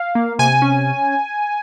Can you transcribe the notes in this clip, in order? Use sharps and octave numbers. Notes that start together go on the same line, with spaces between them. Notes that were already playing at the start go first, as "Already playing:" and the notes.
Already playing: F5
A#3
C3 G#5
C#4